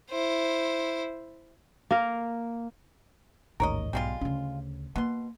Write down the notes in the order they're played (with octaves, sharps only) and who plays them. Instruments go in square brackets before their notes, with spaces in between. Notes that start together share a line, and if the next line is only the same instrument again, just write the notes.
[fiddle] E4 C5
[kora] A#3 A#4
[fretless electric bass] A1 D#2 [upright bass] G#2 [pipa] A#4 C#5 D#5
[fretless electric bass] B1 [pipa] G3 G#3 F4
[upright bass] D2 C#3 [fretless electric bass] C#4
[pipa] B2 C6 [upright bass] A#3